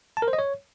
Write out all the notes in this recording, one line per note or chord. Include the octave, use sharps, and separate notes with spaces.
A5
A#4
C5
D#5
C#5